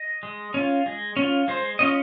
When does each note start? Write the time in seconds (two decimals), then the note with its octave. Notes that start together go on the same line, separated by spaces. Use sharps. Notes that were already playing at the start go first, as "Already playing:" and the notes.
Already playing: D#5
0.23 G#3
0.54 C#4 F4
0.86 G#3
1.17 C#4
1.22 F4
1.48 G#3 C5
1.79 C#4 F4 D#5